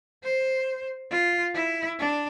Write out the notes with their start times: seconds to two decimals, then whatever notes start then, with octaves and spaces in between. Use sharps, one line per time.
0.23 C5
1.10 F4
1.55 E4
1.99 D4